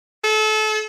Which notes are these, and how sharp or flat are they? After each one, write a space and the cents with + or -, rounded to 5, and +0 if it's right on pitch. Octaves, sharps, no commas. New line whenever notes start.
A4 -30